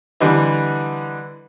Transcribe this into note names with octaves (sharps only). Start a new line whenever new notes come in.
D3 E3 G3 D#4